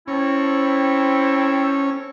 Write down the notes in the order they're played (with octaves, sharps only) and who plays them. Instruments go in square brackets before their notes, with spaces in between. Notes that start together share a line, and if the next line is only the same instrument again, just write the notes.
[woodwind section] C4 E4 A4 [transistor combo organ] C#4